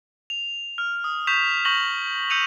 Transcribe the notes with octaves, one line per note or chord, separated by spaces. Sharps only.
F7
F6
D#6
C#6 G6 B6 E7 F7
C#6 G6 A#6 F#7 G7
E6 G6 C#7 D#7 F7